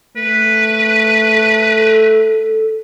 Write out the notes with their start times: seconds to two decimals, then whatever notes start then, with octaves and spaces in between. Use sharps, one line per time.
0.16 A3 B4
1.34 A4